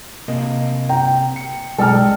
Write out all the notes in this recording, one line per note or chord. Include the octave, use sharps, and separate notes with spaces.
C3 A#3 D#5
G5 A#5
C#7
B1 G#3 A4 D5 G5 A#5 F6